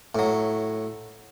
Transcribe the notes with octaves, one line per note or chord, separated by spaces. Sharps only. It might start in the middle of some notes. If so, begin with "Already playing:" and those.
A2 F#3